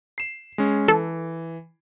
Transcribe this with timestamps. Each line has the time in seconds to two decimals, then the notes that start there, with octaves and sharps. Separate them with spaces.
0.18 C7 E7
0.58 G#3 C#4
0.88 E3 A4